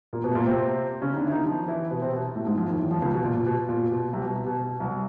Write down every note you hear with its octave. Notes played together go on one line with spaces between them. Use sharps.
A#2 A#3
B2 B3
A3
A#2 A#3
C3 C4
C#3 C#4
D#4
D3 D4
E4
D#3 D#4
F3 F4
E3 E4
B2 B3
C3 C4
B2 B3
A2 A3
G#2 G#3
F2 F3
D#2 D#3
E2 E3
F2 F3
C#2 C#3
B2
A#2
A#2
B2
B2
A#2
B2
C2 C3
B2
B2
B2
B2
C2 C3